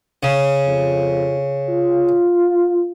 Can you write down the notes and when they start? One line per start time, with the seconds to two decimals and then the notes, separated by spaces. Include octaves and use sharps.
0.23 C#3
0.66 F2
1.69 F4